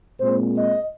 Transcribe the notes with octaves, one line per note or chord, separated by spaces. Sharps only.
A#2 G#3 C4 C5
D#5